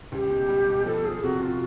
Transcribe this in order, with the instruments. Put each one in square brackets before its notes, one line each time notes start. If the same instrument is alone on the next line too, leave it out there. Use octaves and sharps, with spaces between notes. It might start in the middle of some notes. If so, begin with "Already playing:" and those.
[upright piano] C#2 [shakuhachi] G4
[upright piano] B2
G3
B2
[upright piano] F3 [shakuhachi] A4
[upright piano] F3 [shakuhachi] G#4
[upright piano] C3 [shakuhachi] F#4
[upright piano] C3 [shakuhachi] F4